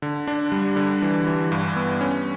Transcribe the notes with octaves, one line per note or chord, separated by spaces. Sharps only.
D3
D4
G3
D3
E3
E3
G2
B3
C#4